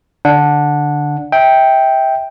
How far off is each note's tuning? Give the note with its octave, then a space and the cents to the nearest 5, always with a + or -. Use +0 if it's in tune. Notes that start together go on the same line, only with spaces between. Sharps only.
D3 +0 D4 +0 F#5 -15
E5 -30 G5 +0